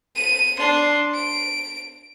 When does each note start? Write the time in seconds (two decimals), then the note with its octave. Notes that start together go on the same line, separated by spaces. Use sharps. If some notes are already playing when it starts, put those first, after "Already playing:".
0.15 D#7
0.59 D4 C6
1.14 D7